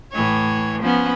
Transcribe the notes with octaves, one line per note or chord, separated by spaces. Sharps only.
A2 E3 C#5
F3 B3 C#4